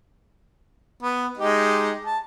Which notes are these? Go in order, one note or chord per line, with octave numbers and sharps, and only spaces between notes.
B3
G#3 D#4 G4
A5